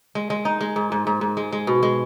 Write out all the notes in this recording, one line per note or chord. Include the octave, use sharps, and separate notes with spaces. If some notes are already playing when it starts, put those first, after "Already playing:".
G#3
G#3
D#4
G#3
G#2
G#2
G#2
G#2
G#3
G#3
B2
G#3